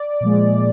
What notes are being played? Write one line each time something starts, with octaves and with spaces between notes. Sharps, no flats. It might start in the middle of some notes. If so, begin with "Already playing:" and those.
Already playing: D5
A#2 F3 G#3